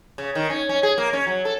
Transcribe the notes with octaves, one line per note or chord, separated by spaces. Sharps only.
C#3
D#3
C#4
C#4
G#4
A#3
C#4
F#3
A4